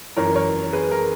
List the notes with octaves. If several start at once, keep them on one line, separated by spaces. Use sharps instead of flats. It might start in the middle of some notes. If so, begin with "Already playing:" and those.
F#2 E3 A#4 C#5
A#4 C#5
G#4 B4
A#4